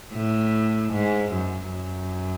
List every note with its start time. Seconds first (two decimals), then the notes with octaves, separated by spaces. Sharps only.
0.14 A2
0.93 G#2
1.32 F#2
1.71 F#2